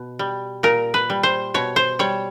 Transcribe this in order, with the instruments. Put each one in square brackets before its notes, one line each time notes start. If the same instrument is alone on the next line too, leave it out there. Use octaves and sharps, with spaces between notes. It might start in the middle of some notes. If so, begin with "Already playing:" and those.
Already playing: [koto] B2
G3
A#2 A#4
B4
G3
C5
B2 C#5
C5
G3 C#5